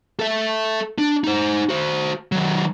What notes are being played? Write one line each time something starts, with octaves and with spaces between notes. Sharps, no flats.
A4 E5
D4
D#4 C5
F#4 C5
D#3 F#3